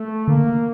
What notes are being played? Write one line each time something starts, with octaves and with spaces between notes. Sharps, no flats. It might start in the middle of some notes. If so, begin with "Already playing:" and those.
Already playing: A3
D3 A#3